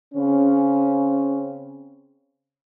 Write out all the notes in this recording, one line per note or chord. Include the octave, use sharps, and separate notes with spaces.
C#3 C4 C#4